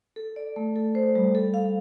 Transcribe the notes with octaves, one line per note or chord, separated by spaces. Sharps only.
A4
D5
A3
A4
C5
G3
A4
F5